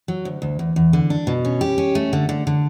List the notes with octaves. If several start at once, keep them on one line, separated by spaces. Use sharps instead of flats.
F#3
D2
D2
E2
E2
D3
D4
B2
C#4
G4
C#4
A3
D3
D3
D3